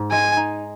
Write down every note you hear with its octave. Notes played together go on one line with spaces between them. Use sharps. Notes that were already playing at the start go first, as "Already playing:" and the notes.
Already playing: G#2
G#3 G#5
D#4